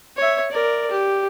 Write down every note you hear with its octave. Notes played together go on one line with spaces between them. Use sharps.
C#5 E5
A#4 D5
G4